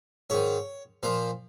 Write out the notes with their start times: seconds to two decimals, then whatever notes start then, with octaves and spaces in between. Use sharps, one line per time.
0.30 G#2 D#3 C#5
1.03 A#2 F3 C5